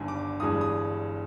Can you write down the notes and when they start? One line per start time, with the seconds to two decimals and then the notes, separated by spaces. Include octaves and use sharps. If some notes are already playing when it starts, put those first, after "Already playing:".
Already playing: G1 G2 D#3 G#5
0.08 D6
0.40 G1 G2 E3 G#3 D#6
0.61 D#6